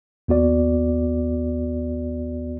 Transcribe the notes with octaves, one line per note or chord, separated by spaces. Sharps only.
D#2 B3 F#4 D5